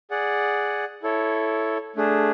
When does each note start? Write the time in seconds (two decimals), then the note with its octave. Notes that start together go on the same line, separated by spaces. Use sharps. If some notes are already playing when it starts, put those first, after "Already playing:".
0.11 G#4 D5 F#5
1.03 E4 A4 C#5
1.96 A3 D4 G#4